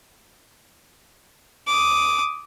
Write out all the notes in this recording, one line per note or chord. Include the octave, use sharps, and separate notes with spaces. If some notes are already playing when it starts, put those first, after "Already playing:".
D6 D#6